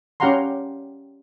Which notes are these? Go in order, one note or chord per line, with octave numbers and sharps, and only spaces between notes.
C#4 G4 F5 F#5 A#5 C6